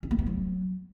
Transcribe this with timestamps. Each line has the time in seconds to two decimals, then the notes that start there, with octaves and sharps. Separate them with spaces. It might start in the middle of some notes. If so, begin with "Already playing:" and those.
0.03 C#4
0.11 A#3
0.19 B3
0.26 F#3